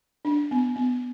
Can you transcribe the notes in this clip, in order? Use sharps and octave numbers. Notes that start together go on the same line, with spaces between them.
D4
B3
B3